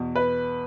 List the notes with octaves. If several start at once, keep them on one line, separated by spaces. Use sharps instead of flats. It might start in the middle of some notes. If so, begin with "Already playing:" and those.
Already playing: E2 B2
B4